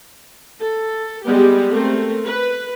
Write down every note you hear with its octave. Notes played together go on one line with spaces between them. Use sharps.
A4
G3 G#3 B3 G4
A3 C4 A#4
B4